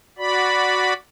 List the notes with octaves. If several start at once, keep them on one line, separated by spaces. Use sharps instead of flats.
F#4 D5 B5